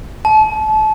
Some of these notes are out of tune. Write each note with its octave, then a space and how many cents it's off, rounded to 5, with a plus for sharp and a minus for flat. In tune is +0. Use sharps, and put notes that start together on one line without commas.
A5 -30